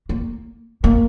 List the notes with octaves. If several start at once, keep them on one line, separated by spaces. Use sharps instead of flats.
A#3
A#3